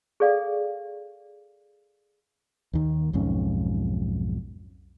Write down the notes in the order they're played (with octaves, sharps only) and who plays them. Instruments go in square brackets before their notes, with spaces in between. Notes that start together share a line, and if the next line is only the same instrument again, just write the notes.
[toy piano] G#4 A4 D5 F5
[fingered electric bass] D#2 D#3
B1 F2 G#2 C#4